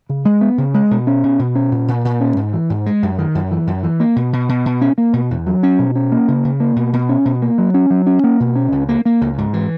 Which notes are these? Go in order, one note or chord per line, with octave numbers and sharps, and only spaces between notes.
C#3
G#3
B3
C#3
G#3
B2
C#4
B2
B2
C#4
A#2
A#2
A#2
C#4
G#2
E3
G#2
G#3
F#2
D#3
F#2
E3
F#2
E3
A#3
B2
B2
B2
B2
C#4
A#3
B2
E2
F#3
C#4
B2
C#4
A#3
C#3
C#3
A#3
B2
B2
C#4
B2
A#3
F#3
C#4
F#3
C#4
A#3
B2
C#4
C#2
A#3
A#3
C#2
G#2
E3